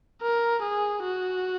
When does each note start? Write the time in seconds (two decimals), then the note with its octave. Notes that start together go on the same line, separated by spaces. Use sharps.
0.22 A#4
0.63 G#4
1.04 F#4